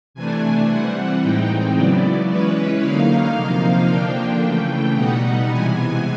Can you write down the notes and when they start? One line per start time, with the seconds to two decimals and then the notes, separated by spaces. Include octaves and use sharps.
0.14 C3 E3 A3 D4 G#5
0.68 E3 G3 C4 F#5
1.21 A2 E3 G#3 C4 D#4 G5
1.75 C#3 F#3 B3 E4 D5
2.28 E3 G#3 C#4 E4 B4
2.81 D3 F#3 A#3 D#4 F5
3.35 C3 F3 A#3 D#4
3.88 D3 F3 A#3 D4 G5
4.42 C#3 E3 A3
4.95 B2 G3 B3 D#4 F#5
5.48 C3 E3 G#3 B3 G#5